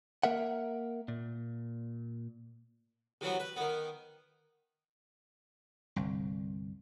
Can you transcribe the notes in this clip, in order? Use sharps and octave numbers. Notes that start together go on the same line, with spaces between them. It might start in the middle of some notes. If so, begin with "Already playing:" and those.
A#3 A#4 E5 F#5
A#2
C3 E3 F#3 B3
B4
D#3 B3
G1 C2